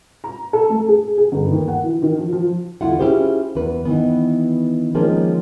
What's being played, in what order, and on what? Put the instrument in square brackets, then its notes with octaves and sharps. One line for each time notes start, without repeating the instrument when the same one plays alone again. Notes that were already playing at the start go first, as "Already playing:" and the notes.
[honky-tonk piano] A#5
A4
A3
G#4
G#4
G1
D#2
F#5
E3
D#3
F3
F3
[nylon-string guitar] E2 D3 E4 F4 E5 F#5
C#4 E4 F4 G4 G#4 C5
E2 B4
D#3 E3 B3
D#3 F3 G#3 A#3 C#4